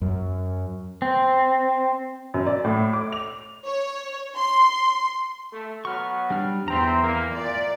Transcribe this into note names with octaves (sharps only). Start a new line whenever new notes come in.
F#2
C4
F#2
D5
A2
D6
F7
C#5
C6
A3
F#3 B3 F#4 C#6 F6
G3 D4 F6
E2 C4 E5 A#5
A#3
A#2 D5